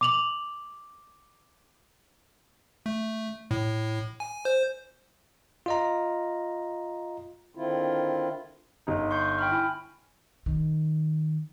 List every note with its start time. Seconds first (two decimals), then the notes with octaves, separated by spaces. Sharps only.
0.01 D6 F7 F#7
2.86 A3
3.51 A2
4.20 G#5
4.45 C5
5.66 F4 D#5 A#5
7.55 D3 D#3 C4 E4 F4
8.87 G1 D#4
9.11 C6 C#6 G6
9.39 G5 B5 F6
9.51 E4 G#5
10.46 D#3